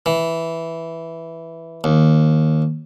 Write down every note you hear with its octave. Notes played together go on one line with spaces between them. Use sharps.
E3
D#2